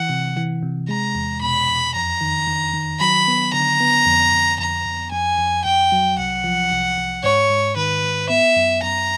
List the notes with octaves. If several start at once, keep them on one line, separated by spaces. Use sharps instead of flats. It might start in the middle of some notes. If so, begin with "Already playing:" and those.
Already playing: E3 F#5
C3
E3
C3
G#3 A#5
E2
B2 B5
E2
F2 A#5
D#3
D#3
D#3
F#3 B5
B3
D3 A#5
B3
F2
F2
F2 A#5
F2
F2 G#5
F2
F2 G5
F#3
C2 F#5
F3
C2
C2
G#2 C#5
G#2
D#3 B4
G#2
B3 E5
F#2
F#2 A#5